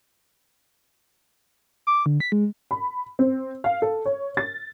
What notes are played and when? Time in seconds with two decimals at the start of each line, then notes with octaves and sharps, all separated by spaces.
1.87 D6
2.06 D3
2.20 B6
2.32 G#3
2.71 B5
3.19 C4
3.64 F5
3.82 A4
4.06 C#5
4.37 A6